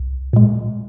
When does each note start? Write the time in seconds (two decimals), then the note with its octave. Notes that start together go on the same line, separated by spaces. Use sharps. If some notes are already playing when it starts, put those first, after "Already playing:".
Already playing: C2
0.33 A#2 G#3